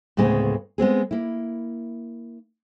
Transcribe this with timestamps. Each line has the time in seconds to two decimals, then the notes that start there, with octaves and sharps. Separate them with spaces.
0.17 D2 A2 C#3 G#3 B3 C4
0.78 G#3 B3 C4 G#4
1.11 A#3 E4